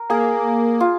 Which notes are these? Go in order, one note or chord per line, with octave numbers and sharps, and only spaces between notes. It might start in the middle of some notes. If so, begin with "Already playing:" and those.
Already playing: A#4
A#3 G#4
F4